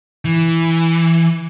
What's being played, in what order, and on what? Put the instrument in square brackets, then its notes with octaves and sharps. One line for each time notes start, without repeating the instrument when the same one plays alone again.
[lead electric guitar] E3